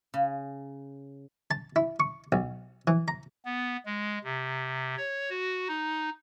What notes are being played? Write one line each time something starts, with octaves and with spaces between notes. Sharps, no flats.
C#3
A5
E4
C#6
B1
E3
A#5
B3
G#3
C3
C#5
F#4
D#4